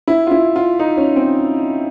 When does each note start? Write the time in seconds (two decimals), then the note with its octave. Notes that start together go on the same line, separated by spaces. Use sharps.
0.07 E4
0.27 F4
0.31 E4
0.56 F4
0.79 D#4
0.97 C#4
1.16 C4